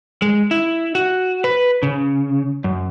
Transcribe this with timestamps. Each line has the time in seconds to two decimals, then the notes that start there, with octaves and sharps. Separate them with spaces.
0.22 G#3
0.51 E4
0.95 F#4
1.44 B4
1.83 C#3
2.64 F#2